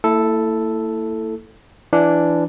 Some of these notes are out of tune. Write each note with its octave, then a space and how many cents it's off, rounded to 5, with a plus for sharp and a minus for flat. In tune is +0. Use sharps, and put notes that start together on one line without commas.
A#3 -45 E4 +0 A4 +0
E3 +20 D4 +0